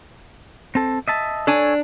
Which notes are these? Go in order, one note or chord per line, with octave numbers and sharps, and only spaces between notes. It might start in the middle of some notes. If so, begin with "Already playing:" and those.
C4 A4
D#5 E5 A5
D4 A4 C#5 G#5